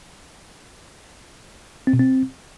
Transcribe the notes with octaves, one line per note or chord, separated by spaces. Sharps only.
C4
B2
C4